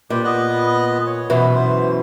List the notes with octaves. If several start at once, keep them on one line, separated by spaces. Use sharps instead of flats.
A#2 G4 B4
B3 B4 D#5
C#5
F#2 B2 E3
C5